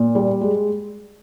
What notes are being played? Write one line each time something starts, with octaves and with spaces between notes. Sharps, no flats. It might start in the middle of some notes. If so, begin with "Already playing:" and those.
Already playing: A#2
G3
G#3